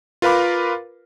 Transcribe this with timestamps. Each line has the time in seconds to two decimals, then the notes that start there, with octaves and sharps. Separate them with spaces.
0.22 F4 A#4 B4 F5 B5 D6